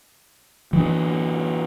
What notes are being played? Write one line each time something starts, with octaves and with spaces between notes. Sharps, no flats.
E3 D4